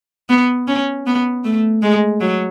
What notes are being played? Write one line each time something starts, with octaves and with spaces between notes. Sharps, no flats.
B3
C#4
B3
A3
G#3
F#3